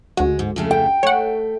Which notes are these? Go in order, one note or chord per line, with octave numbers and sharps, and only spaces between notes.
D2 G#3 F#4
G#2
F2 C#3 A3
G5
A3 C#5 F#5